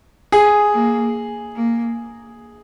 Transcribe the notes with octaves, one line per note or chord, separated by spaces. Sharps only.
G#4
A#3
A#3